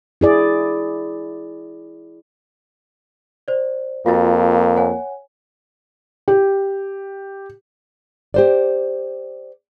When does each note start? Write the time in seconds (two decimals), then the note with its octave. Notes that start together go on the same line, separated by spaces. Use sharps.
0.21 E4 G#4 D5
3.48 C5 D5
4.06 F2 A#3 F4 F#4 A6
4.76 C#5 F#5 G#5
6.28 G4
8.34 G4 C5 D5